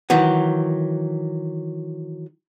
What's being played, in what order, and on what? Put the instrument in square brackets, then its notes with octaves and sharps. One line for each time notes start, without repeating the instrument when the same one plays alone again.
[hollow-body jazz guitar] D#3 E3 F#3